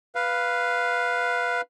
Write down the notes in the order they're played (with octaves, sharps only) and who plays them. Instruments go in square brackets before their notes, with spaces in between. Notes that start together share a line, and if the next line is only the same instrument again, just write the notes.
[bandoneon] B4 F5